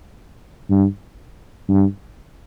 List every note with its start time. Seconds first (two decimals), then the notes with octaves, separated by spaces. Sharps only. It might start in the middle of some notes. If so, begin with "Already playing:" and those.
0.70 G2
1.69 G2